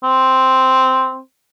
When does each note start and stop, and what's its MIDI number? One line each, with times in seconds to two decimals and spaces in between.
0.04 1.19 60